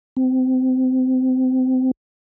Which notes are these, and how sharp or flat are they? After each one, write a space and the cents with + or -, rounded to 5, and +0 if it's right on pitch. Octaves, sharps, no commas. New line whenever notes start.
C4 -25